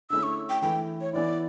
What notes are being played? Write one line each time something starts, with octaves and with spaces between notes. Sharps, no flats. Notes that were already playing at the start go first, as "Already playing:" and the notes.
D3 A3 C#4 E4 E6
C#6
G5
E3 A3 E4 G5
C#5
E3 B3 E4 D5